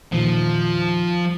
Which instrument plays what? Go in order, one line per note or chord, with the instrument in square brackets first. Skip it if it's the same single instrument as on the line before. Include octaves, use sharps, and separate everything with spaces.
[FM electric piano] E2 A#2 D#3 [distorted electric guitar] F3